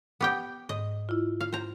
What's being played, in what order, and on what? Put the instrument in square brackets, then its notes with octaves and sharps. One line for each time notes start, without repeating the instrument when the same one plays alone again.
[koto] B3 G4 G5
[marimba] G#2 [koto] D#5
[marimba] E4 F4
[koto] F5
C5 A#5